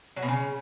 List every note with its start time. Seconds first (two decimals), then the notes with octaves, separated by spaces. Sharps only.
0.16 F#3
0.22 B2
0.28 C#3